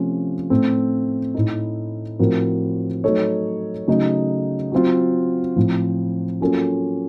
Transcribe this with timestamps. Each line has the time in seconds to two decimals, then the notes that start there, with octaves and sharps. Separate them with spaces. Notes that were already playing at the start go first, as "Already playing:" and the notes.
Already playing: C3 F3 A3 C#4 F4
0.50 A2 A3 C4
1.35 A2 A3 D#4
2.19 A2 F3 C4 F#4 A#4
3.04 F#3 A3 D#4 A4 C#5
3.88 C#3 F#3 A3 D#4
4.72 F#3 C4 F4
5.56 A2 F3 C4
6.40 F#3 A#3 C#4 F4 A4